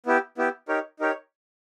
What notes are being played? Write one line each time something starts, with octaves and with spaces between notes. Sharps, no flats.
B3 E4 G4
B3 E4 G4
D#4 G4 A#4 C#5
D#4 G4 A#4 C#5